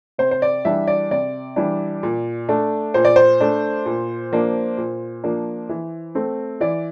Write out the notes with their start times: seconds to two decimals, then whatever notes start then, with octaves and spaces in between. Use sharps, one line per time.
0.18 C3 C5
0.31 C5
0.42 D5
0.65 E3 G3 D4 E5
0.87 D5
1.11 C3 D5
1.56 E3 G3 D4
2.03 A#2
2.49 A3 D4
2.94 A#2 C5
3.05 D5
3.16 C5
3.41 A3 D4
3.86 A#2
4.32 F3 A#3 D4
4.78 A#2
5.24 F3 A#3 D4
5.69 E3
6.15 A3 C4
6.61 E3 D5